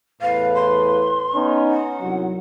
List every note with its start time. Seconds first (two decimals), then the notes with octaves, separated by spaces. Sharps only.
0.21 E2 A2 B4 F5
0.54 C6
1.34 B3 C#4 D#4
1.70 F#5
2.02 C2 F#3